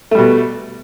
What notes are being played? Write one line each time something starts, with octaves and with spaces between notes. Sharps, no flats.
B2 G3 A3